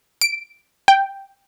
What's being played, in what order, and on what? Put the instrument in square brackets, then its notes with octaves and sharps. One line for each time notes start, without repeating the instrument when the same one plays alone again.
[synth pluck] D7
G5